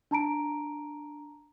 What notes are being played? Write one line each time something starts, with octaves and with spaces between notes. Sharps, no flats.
D4 A5 A#5 D7